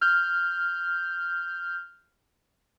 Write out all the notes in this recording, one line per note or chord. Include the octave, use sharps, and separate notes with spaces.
F6 G6